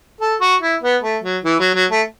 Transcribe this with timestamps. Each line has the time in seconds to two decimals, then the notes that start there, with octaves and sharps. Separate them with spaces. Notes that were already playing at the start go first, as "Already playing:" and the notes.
0.21 A4
0.41 F#4
0.61 E4
0.82 B3
1.03 A3
1.24 F#3
1.45 E3
1.60 F#3
1.75 F#3
1.91 A3